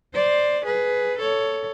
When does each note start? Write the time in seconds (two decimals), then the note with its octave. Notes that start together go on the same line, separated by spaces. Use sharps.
0.14 C5 D5
0.65 G#4 B4
1.18 A4 C#5